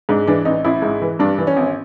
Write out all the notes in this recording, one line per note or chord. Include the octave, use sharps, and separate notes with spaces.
G#2 D4
E3 D4
A1 D#4
A1 E4
G#2
E3
G2 D4
E3
C#4
G#1